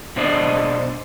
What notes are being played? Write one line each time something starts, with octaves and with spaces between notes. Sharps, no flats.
B2 D4 C5 D5 D#5